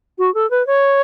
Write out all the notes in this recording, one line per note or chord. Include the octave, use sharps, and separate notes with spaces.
F#4
A4
B4
C#5